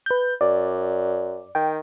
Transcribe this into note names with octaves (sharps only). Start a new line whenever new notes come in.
B4 G6
F#2 D5
D#3 G5